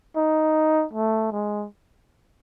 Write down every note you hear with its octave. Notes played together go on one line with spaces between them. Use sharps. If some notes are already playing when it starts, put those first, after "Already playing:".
D#4
A3
G#3